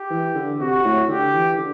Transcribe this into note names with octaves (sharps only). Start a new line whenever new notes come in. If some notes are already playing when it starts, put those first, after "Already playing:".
Already playing: G4
E3
D3
C3 F#4
A2
D3 G4
E3
D3